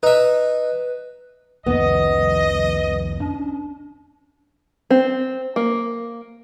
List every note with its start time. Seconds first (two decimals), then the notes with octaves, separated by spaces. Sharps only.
0.03 D#4 B4 E5
1.66 C2 F2 D#3 B3 D#5
3.20 C#4 D4
4.91 C4
5.56 A#3